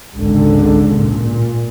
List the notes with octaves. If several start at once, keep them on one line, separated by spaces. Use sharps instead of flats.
G#1 C#2 D3
A#2